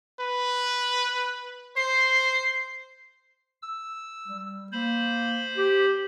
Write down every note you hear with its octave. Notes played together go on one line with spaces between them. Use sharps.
B4
C5 C7
E6
G3
A#3 C5 B5
G4